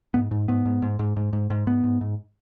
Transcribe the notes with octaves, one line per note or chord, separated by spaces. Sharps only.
G#2 B3
G#2
G#2 B3
G#2
G#2
G#2
G#2
G#2
G#2
G#2 B3
G#2
G#2